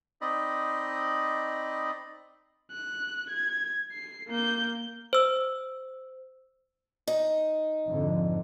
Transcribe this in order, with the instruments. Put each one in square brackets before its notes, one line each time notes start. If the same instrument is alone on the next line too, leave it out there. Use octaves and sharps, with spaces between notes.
[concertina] C4 D#4 D5 D#5 B5
[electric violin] F#6
G#6
C7
A#3 G6
[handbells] C5 E6
[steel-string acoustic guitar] D#4
[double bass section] F2 G#2 D3